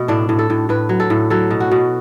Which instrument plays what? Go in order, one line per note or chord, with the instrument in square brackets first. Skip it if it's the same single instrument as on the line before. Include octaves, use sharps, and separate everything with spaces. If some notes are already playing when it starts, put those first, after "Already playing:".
Already playing: [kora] B2 A3
A2 D4
A2
A4
A2
A2 B4
F#3
A4
A2
F#3 A4
B2
F#4
B2